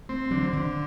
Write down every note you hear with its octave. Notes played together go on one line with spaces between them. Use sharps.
A3 C4
D3 F#3
D3 D#3